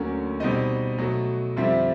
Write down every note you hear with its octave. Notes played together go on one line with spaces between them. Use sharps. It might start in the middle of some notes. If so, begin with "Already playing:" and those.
Already playing: D2 D3 F#3 A#3 C#4
B2 G3 C4 D#4 D#5
B2 F#3 A3
F2 D3 G3 C4 E5